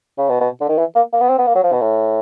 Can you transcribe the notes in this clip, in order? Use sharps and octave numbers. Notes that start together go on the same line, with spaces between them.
C#3
B2
B2
D3
D#3
E3
A#3
A#3
B3
C4
B3
A#3
F#3
F3
B2
A2